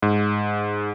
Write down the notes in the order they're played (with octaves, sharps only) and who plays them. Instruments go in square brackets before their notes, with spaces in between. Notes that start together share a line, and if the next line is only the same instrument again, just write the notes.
[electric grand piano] G#2